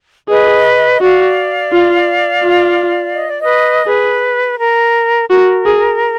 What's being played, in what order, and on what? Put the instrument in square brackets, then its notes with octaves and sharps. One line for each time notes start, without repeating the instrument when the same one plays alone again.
[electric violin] G#4 [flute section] B4 D#5
[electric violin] F#4 [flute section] D5 F5
[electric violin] F4
F4
[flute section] D#5
D5
B4 D#5
[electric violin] G#4 [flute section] B4
[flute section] A#4
[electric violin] F#4 [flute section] A#4
[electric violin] G#4